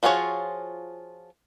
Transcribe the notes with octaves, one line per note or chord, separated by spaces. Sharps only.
F3 F4 F#4 G#4 C#5